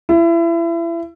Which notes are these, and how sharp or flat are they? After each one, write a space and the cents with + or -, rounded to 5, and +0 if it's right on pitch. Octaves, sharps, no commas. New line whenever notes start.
E4 +30